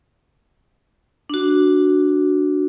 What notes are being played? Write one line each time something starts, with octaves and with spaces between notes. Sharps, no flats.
D4 F#4